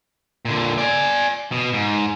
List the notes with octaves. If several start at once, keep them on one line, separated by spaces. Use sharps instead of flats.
A#2 D3
D5 G#5
B2
G#2